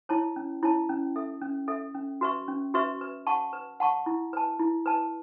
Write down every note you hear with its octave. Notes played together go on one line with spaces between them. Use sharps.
E4 C#5 A5
C#4
E4 C#5 A5
C#4
A4 E5
C#4
A4 E5
C#4
F#4 B4 E5 C#6
C#4
F#4 B4 E5 C#6
B4
F#5 A5 C#6
B4
F#5 A5 C#6
E4
B4 A5
E4
B4 A5